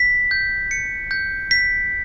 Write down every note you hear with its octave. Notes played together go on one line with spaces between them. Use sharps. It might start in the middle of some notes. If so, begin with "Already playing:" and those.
Already playing: B6
G6
C#7
G6
B6